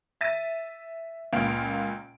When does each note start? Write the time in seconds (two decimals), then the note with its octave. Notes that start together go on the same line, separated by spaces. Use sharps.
0.21 E5 A6 D#7
1.33 C#2 A#2 F5 D7